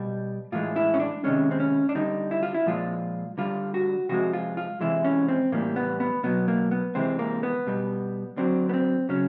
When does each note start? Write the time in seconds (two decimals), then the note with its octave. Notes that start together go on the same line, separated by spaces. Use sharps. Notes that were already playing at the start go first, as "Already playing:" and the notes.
Already playing: B2 G3
0.52 A2 E3 G#3 F4
0.76 E4
0.94 C#4
1.00 D4
1.24 C3 D#3 G#3 C#4
1.51 C4
1.60 C#4
1.89 D4
1.95 D3 G3 D#4
2.31 E4
2.43 F4
2.54 E4
2.66 A#2 F3 G#3 F4
3.38 D3 G3 F4
3.74 F#4
4.09 C3 F3 G#3 F#4
4.33 F4
4.57 F4
4.81 C3 E3 G#3 E4
5.05 C#4
5.28 C4
5.52 A2 E3 G3 A#3
5.76 B3
6.00 B3
6.23 B2 F#3 B3
6.48 A#3
6.71 B3
6.95 C3 E3 G#3 C4
7.19 A#3
7.43 B3
7.67 B2 G3
8.37 D3 F#3 C4
8.69 B3
8.74 C4
9.09 C#3 F#3 C#4